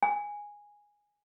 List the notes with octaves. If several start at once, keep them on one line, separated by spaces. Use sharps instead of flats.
G#5